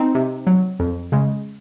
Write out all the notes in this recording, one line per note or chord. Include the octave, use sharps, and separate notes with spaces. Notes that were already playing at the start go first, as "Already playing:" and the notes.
Already playing: C4 D#4
C3
F#3
F2
C#3 G#3